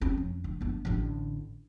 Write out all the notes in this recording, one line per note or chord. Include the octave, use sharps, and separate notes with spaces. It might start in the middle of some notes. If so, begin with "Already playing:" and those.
C4 C#4
F2
D3
G1 B3
A1 D3